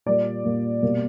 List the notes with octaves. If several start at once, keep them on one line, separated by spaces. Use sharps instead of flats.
A#2 G3 A#3 D5
A#2 G3 A#3
B2 G3 A#3